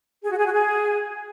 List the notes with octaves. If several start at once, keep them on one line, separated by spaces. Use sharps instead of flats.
G#4
F#4
G#4
F#4
G#4